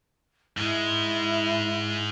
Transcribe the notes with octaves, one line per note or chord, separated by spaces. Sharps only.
G#2 G#3 E4